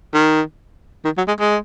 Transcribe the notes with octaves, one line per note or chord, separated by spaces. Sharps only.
D#3
D#3
F#3
G#3
G#3